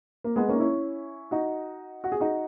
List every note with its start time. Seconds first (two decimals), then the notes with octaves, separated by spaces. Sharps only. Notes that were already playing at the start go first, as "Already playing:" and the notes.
0.24 A#3
0.36 G#3 B3
0.49 A#3 C#4
0.55 D#4
0.60 C#4 E4
1.31 D#4 F#4
2.04 F#4
2.12 G#4
2.20 D#4 F#4